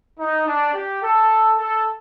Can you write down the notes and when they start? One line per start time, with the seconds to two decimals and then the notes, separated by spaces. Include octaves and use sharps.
0.19 D#4
0.46 D4
0.74 G4
1.02 A4
1.58 A4